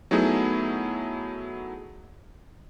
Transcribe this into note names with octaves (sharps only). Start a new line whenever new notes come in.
F#3 A3 B3 D#4 E4 G#4